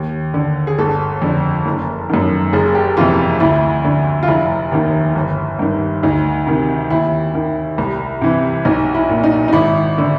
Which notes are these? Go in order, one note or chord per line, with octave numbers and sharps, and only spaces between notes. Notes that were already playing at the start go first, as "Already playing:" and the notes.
Already playing: D#2
D3
G#4
G1 A4
F2 D3
F#1
F#2 D#3
F#1 G#4
G4
F2 C3 E3 F4
D2 E4
D3
F4
F1 E4
D#2 D#3
G1
G2 D#3
D2 D#4
C3 D#3
D#2 E4
D#3
C2
C3 E3
B1 D#4
E4
A#2
D#4
D#4
G#1 E4
D3